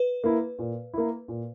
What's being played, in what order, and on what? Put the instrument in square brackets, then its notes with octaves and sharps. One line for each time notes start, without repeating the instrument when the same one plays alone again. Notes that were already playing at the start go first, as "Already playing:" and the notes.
Already playing: [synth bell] B4
[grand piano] A#3 E4
A#2
A#3 E4
A#2